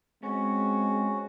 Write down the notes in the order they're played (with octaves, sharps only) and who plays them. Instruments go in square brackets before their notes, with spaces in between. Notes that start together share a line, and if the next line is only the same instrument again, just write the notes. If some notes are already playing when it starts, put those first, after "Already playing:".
[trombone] G#3 [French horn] C4 [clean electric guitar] C#4 [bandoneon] F#4